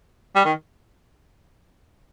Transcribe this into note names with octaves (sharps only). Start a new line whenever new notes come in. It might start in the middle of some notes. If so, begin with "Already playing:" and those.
G3
D#3